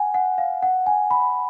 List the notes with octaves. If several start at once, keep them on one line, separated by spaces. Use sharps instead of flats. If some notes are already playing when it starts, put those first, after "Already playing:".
Already playing: F#5 G#5
F#5
F5
F#5
G#5
B5